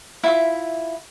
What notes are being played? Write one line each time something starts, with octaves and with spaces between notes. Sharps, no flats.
E4 F4 E5